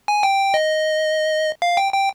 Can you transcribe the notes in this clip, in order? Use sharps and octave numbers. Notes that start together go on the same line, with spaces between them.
G#5
G5
D#5
F5
G5
G5